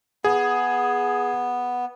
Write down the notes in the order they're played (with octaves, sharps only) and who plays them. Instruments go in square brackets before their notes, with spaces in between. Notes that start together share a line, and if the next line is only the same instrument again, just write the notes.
[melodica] B3 [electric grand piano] G#4